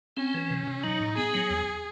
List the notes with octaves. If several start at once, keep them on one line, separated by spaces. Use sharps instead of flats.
C4 C#4
E3
C3
C3
F#3 D#4
A2
B3 G#4
F#3
E2